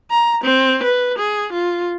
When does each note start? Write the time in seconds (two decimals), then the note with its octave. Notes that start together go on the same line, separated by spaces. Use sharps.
0.11 A#5
0.44 C4
0.83 B4
1.18 G#4
1.52 F4